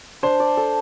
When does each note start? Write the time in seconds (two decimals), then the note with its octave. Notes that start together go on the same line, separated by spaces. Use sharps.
0.23 D4 C5
0.40 D5
0.57 A4